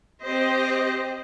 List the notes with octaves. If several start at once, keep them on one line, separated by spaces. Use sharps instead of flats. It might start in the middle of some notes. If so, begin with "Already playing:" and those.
C4 G4 C5 D#5